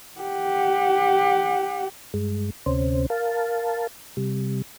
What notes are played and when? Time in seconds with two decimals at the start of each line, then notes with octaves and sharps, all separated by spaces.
0.20 G4 F#5
2.14 G2 G#3
2.66 D2 C3 C#4 C5
3.10 A#4 F5 A5
4.17 C3 G3